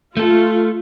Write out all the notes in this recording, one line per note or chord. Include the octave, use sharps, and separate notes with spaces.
A3 F4 A4